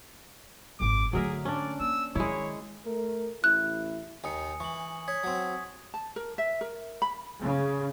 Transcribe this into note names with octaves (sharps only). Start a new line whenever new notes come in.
G#1 F#2 D6
D3 F#3 A3 G#4 A#4 E5
C#4 D4 D5
A#3 E6
D#3 G#3 E4 C#5
A3 A#4
A1 E4 F#6
D#2 D#3 G#5 D#6 C#7
E3 C#6 F#7
C#5 D#6 G#6 B6
F#3 C4
A5
A#4
E5
A#4
B5
C#3